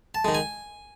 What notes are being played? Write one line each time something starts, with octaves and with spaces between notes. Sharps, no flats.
A5
D#3 G#3
G#5